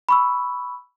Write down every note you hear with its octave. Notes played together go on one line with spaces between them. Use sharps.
B5 C#6 E6